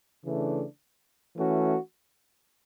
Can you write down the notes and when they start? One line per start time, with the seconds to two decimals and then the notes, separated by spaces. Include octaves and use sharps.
0.24 C#3 E3 A3 D4
1.36 E3 A3 C#4 F#4